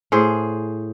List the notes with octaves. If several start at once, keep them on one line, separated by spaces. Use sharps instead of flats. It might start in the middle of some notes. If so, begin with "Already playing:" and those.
A2 G#4 C5